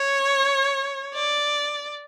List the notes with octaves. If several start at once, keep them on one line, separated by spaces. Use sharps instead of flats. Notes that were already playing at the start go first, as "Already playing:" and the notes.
Already playing: C#5
D5